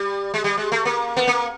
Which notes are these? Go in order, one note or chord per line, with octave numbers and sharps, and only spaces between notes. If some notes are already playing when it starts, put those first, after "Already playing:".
Already playing: G3
G#3
G3
G#3
A3
A#3
B3
A#3